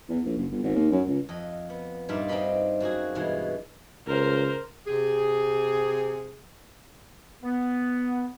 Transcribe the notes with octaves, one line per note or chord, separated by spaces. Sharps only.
E2
A#1
F#1
G1
G#1
D#2
F#2
C#2
F2 D#5
B3
G2 A#2 D#4 F4 D5 E5
C4 D4 D#4 D#5 B5 C6
F#2 A#3 F#4 G#4
G2 B2 E3 G#3
C#2 A#4 C5
C3 G4 G#4
B3